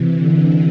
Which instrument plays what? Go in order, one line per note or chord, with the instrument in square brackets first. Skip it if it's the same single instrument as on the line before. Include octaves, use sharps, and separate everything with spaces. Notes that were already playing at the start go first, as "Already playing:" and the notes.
Already playing: [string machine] C3 E3
D3